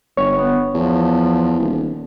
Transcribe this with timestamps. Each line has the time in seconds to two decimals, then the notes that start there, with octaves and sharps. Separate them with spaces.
0.17 G1 C#5
0.32 B3
0.74 E2 F3
1.59 D#1